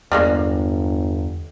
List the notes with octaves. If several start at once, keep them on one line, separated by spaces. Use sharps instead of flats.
G1 E2 G3 G#3 A#3